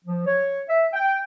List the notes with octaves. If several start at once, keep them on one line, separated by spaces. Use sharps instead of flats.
F3
C#5
E5
G5